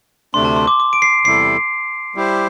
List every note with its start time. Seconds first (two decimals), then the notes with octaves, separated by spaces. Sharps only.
0.34 D2 C3 A3 D4 C6
0.45 A5
0.57 C6
0.67 D6
0.80 D6
0.93 D7
1.02 C7
1.25 E2 C3 G3 E4 A4 C7
2.15 G3 E4 G4 C5